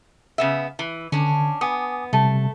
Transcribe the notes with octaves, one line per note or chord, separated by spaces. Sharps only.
C#3 B3 E5
E3
D3 C#4 D4
B3 G#5 D6 D#6
C3 G3 A3 A5